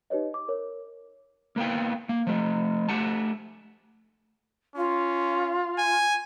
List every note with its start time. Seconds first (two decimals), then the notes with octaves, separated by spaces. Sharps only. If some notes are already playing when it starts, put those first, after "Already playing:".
0.10 D#4 G4 B4 C#5 D#5
0.34 D6
0.48 A#4 C#5
1.56 A#3 B3 F5 G5
2.09 A#3
2.27 F3 A3
2.89 A3 G4 F#5 A5
4.76 C#4 F4
5.78 G#5